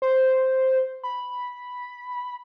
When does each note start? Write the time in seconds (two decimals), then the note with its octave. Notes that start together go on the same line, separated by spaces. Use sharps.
0.02 C5
1.04 B5